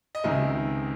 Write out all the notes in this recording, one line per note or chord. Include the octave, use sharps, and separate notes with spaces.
D#5
C#2 C3 D#3 G#3 E5